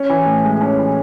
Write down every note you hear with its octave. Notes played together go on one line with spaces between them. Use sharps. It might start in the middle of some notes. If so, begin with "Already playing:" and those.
Already playing: C#4
E3
A2
G#3
C#4
E3